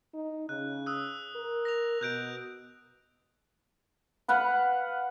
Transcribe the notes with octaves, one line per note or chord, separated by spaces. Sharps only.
D#4
C#3 F#6
D#6 E6 F#6
A#4
A#6 F7
B2 F#6 G6 D7
B4 F5 F#5 B5